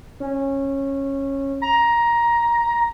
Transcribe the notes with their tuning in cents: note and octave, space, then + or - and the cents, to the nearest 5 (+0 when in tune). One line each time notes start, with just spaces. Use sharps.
C#4 -15
A#5 +15